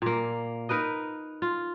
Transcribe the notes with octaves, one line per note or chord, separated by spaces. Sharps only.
A#2 A#3
D#4 A#4 B4 D#5
F4